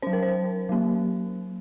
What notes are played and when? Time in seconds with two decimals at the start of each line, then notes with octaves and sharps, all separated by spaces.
0.02 F#3 C#4 C5
0.13 A#4
0.23 C5
0.69 F#3 A#3 C#4